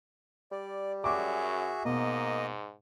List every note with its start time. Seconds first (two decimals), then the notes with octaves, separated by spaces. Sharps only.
0.52 G3 D5
1.04 F#2 F#4 G#4 E5 C#6 D6
1.85 G#2 B2 A#3 D#5